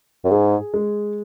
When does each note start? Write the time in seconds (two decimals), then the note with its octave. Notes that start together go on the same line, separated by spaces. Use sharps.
0.24 F#2
0.31 G#2 G#4
0.74 G#3